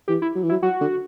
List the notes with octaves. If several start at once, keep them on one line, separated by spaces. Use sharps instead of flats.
E3 G4
E4
F#3
E3
F#3 E4
F#3 F#4
D3